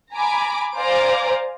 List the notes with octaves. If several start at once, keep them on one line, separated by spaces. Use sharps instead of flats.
G#5 A#5 B5 D6
C5 D5 F5 G#5 A#5 D6